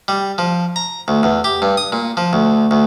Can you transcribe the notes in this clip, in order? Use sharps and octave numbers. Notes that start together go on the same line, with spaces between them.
G3
F3
A#5
D2
E2
G4
G2
D#6
A#2
F3
D2
D2